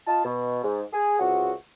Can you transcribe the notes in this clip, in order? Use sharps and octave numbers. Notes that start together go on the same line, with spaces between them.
F4 D#5 A5
B2
G#2
G#4
C#2 C3 F#4